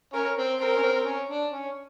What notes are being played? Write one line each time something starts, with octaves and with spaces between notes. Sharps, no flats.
C#4 A#4
C4
C4 A#4
C#4
C4
C#4
D4
C#4